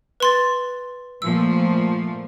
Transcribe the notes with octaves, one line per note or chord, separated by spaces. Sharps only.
B4 C6 A6
A#2 F3 A3 E6